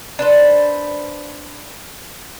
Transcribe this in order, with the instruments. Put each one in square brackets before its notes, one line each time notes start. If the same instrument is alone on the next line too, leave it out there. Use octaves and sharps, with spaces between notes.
[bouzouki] D4 B4 C5